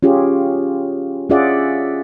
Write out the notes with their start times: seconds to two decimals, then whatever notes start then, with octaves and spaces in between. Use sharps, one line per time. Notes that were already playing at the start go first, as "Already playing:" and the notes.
0.03 C#4 F4 G4 G#4
1.30 C#4 F4 G#4 D5 E5 F#5